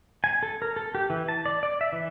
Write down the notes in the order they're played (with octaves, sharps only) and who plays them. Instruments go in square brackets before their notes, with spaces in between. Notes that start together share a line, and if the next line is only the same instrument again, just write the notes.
[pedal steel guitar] G#5
A4
A#4
A4
G4
E3
A5
D5
D5
E5
E3